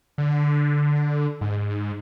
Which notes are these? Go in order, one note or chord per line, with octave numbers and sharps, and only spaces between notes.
D3
G#2